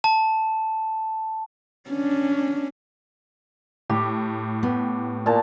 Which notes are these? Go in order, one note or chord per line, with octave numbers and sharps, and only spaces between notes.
A5
C#4 D4
A2 G4
B3
A#2 A5